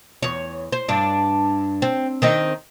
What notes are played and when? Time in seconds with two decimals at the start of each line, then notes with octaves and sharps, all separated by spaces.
0.23 E2 C#5
0.72 C5
0.89 G2 D4
1.82 C4
2.22 D#3 C4 D#4